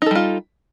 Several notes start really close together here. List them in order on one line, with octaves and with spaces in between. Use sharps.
D#4 A4 G3 F4